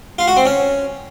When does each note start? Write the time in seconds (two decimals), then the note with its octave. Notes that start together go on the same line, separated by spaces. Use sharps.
0.19 F4
0.27 F#4
0.36 C4
0.45 C#4